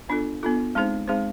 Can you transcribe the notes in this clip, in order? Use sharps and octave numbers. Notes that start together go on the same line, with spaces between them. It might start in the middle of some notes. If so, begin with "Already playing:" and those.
B3 D4 F4 A4
B3 D4 F4 A4
G#3 C4 D#4 G#4 C5
G#3 C4 D#4 G#4 C5